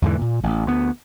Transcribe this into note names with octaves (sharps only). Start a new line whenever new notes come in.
E2 G#2 D3 E3
A#2
A1
D2 B3